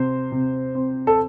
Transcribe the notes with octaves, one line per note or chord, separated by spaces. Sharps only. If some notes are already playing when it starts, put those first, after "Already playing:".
Already playing: C3 C5
C3
C4
A4